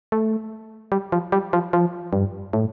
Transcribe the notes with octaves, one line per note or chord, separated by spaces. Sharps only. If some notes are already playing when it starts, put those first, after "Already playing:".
A3
G3
F3
G3
F3
F3
G2
A2